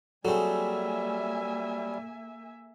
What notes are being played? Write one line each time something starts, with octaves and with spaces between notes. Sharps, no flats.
F#3 G3 A#3 C4 G#4 A4 E5 G#5